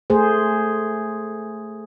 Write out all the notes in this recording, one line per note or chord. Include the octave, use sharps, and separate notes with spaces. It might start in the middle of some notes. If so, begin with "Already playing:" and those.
A3 G#4 C5